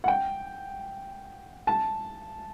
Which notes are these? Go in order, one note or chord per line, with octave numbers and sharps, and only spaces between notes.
F#5
G5
A5